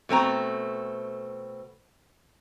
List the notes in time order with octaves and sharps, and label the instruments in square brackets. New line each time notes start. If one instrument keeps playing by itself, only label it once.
[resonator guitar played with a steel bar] B2 A3 C4 A#5